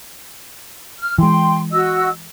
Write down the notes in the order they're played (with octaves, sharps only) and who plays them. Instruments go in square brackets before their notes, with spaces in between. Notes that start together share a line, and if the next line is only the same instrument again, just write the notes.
[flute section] F6
[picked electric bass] E3 G#3 [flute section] G5 C6
[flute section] F#4 D#5 E6